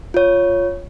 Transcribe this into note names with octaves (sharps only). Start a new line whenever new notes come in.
F4 C#5